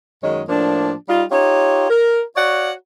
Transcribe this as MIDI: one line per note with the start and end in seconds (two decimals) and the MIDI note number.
0.23 0.42 42
0.23 0.42 51
0.23 0.42 56
0.23 0.42 73
0.23 0.42 75
0.49 0.92 45
0.49 0.92 53
0.49 0.92 58
0.49 0.92 62
1.08 1.23 55
1.08 1.23 63
1.08 1.23 65
1.31 1.89 63
1.31 1.89 65
1.31 1.89 67
1.31 1.89 73
1.89 2.21 70
2.35 2.71 66
2.35 2.71 73
2.35 2.71 74
2.35 2.71 77
2.35 2.71 78